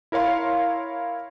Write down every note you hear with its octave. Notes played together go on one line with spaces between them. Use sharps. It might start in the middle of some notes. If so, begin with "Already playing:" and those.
E4 A#4 C#5 F5 C6